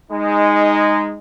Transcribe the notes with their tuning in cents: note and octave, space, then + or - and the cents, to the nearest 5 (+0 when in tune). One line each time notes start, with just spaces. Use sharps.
G#3 -15 D#4 +0